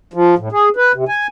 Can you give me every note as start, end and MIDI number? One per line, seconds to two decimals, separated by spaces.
0.14 0.35 53
0.38 0.49 45
0.52 0.69 68
0.77 0.92 71
0.94 1.04 48
1.08 1.27 80